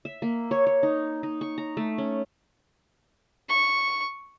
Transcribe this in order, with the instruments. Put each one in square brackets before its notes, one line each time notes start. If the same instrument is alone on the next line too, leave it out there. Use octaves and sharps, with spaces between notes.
[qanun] E5
A#3
C#5
C#5
D#4
D#4
C#6
A#5
A3
C#4
[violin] C#6